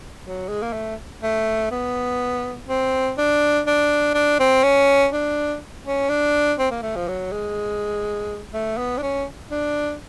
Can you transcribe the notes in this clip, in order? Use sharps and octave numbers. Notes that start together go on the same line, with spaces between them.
F#3
G#3
A#3
A3
A3
B3
C4
D4
D4
D4
C4
C#4
D4
C#4
D4
C4
A#3
A3
F3
F#3
G#3
A3
B3
D4
C#4
D4